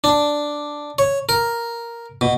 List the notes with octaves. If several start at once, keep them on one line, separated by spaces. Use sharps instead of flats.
D4
C#5
A#4
B2